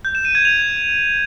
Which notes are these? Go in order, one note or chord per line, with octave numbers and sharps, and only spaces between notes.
G6
E7
D#7
G#6
F7